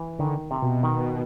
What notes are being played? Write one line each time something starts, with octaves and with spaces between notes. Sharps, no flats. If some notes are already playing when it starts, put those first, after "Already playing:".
Already playing: E3
D3 D#3
C3
B2
D#3